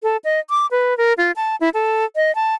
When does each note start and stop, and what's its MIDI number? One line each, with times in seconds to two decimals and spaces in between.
0.03 0.17 69
0.24 0.40 75
0.50 0.66 86
0.71 0.97 71
0.98 1.13 70
1.18 1.32 65
1.36 1.56 81
1.61 1.69 64
1.74 2.05 69
2.16 2.34 75
2.35 2.55 81